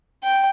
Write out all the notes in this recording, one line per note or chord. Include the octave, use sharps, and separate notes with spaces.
G5